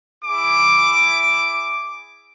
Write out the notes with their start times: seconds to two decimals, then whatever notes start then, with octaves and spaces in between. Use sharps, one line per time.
0.25 E4 G#4 D6